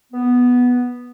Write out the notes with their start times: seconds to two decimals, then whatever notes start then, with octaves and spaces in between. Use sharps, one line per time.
0.13 B3